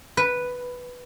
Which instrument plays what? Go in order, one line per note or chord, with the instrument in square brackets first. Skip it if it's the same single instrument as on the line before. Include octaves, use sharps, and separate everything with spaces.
[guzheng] B4